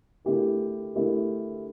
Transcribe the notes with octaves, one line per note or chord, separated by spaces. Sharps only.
D3 A3 E4 G4 A#4
D3 A3 E4 G4 A#4